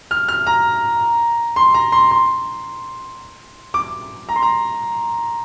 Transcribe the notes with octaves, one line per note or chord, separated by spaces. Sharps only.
F6
F6
A#5
C6
A#5
C6
C6
D6
A#5
C6
A#5